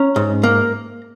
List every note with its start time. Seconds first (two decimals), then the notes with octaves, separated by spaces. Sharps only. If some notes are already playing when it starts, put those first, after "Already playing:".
Already playing: C#4 A#5
0.16 G#2
0.43 A#3